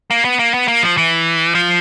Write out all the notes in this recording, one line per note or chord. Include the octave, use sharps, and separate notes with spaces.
A#3
B3
A#3
B3
A#3
F3
E3
F3